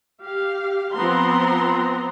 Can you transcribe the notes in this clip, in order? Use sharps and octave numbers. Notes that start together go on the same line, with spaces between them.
G4 F5
F3 B3 C4 A#5 C6